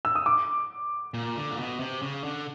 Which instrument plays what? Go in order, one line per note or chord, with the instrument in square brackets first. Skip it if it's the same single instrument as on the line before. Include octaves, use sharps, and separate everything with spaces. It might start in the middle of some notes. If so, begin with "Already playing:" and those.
[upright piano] E6
D#6
D6
[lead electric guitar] A#2
D3
A#2
B2
C3
C#3
D3